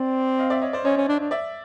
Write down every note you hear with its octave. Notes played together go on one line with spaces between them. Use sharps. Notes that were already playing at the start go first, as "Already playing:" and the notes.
Already playing: C4 D5
D#5 F5
D5 E5
C#5 D#5
C5 D5
C#4 C#5 D#5
C#4
D4
D4
D5 E5